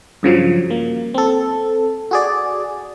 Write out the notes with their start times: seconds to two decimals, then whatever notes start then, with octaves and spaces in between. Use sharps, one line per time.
0.23 G2 C#3 F3 F#3
0.70 A#3
1.14 C4 A4
2.11 F#4 G#4 D5